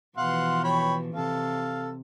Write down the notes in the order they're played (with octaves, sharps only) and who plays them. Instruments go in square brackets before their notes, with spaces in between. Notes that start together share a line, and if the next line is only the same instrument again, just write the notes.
[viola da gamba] B2 E3 F3 [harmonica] F5 F#5 C6
[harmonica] C#5 G5 B5
[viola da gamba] C3 [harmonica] A4 F5